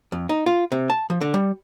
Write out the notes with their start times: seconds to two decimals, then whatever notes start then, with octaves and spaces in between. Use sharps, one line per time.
0.12 F2
0.29 D#4
0.46 F4
0.72 C3
0.90 A5
1.10 F3
1.21 D3
1.34 G3